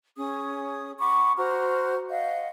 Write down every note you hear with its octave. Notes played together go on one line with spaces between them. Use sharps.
C#4 G#4 D#6
F#5 B5 C#6 D6
F#4 C5 A#5 F6
D#5 F5 F#5